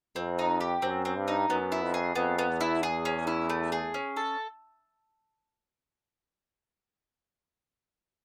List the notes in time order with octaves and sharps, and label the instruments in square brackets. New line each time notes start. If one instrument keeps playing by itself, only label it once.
[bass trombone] F2 [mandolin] C4
[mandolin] D#4
G4
[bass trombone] F#2 [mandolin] C4
[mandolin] C4
[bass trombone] G2
[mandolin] D#4
[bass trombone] F#2 [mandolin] B3
[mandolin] E4
[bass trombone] F2
[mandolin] G#4
[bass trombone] F2 [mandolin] B3
[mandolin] B3
[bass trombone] E2
[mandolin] E4
G#4
C#4
E4
A3
G#4
C#4
A4